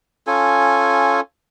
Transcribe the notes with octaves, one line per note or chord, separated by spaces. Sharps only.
C#4 F4 A4 G#5